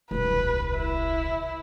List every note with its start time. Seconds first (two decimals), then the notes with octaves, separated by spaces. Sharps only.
0.11 D#1 C2 B4
0.76 E4